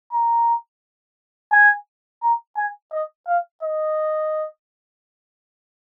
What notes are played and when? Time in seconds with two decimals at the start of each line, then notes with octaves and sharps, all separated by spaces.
0.12 A#5
1.52 G#5
2.23 A#5
2.57 G#5
2.92 D#5
3.28 F5
3.63 D#5